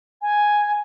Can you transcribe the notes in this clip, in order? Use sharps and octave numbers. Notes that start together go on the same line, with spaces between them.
G#5